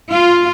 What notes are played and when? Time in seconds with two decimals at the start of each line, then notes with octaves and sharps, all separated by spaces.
0.10 F4